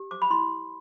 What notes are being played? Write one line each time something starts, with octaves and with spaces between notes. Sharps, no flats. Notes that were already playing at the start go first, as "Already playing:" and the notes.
Already playing: G4
C5 D6
B5
E4 C6